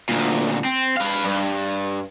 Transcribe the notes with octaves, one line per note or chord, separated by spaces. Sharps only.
D2 A#2
C4
B4 F5
G2